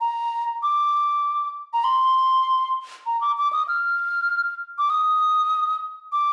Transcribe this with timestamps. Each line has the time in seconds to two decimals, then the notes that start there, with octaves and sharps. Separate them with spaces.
0.01 A#5
0.63 D6
1.73 A#5
1.84 C6
3.06 A#5
3.21 D6
3.38 D6
3.53 D#6
3.68 F6
4.78 D6
4.90 D#6
6.12 D6